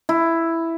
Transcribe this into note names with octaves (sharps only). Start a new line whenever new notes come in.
E4